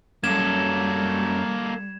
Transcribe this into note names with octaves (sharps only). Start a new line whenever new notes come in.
F#2 G3 A#3 A4 G#6 E7